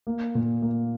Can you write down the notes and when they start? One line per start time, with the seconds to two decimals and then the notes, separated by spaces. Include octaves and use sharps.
0.07 A#3
0.35 A#2
0.62 A#3